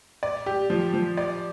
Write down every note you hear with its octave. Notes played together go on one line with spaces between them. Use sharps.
D5
G4
F3
F3
D5